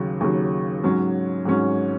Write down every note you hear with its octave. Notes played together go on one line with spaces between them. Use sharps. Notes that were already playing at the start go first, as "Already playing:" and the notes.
Already playing: D#2 C#3 F#3
D#2 C#3 F#3
G#2 F#3 C#4
G#2 F#3 C#4